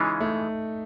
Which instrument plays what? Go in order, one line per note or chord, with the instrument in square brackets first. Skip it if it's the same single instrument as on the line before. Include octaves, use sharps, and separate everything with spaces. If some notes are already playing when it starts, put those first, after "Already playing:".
Already playing: [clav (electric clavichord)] C#3 E3 G#3 C#4 F4 [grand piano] D#4
[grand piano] A3